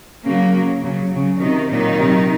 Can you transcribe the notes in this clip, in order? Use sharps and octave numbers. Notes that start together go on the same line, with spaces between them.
C#3 F#3 A#3
C#3 F#3
C#3 F#3
F#3
C#3
C3 D#3 F#3 D#4
A#2 D#3 F#3 D#4
C3 F#3